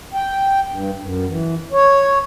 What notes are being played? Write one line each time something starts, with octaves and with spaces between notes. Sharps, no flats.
G5
G2
F#2
E3
C#5